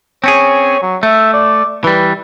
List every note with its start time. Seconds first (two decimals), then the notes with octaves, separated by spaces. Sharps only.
0.24 C4 C#4 G#4 C#5
0.82 F#3
1.03 A3 E5
1.34 D5
1.84 E3 G3 B4